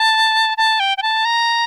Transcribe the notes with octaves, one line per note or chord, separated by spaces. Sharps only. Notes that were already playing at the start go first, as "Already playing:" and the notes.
Already playing: A5
A5
G5
G5
A5
A#5